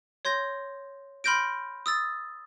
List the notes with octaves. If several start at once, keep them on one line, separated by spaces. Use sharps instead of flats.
C#5 C6 G6 A#6
B5 C6 F6 G6 A#6 D7
D#6 E6 A6